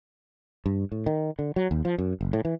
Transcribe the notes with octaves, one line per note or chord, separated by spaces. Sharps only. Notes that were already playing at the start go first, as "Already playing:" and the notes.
G2
A2
D#3
D3
F#3
D#2
F3
F#2
F#1
A2
E3